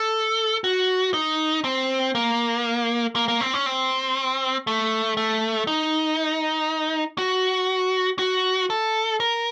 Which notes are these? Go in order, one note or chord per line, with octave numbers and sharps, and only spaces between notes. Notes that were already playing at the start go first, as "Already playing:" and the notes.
Already playing: A4
F#4
D#4
C4
A#3
A#3
A#3
C4
C#4
C4
A3
A3
D#4
F#4
F#4
A4
A#4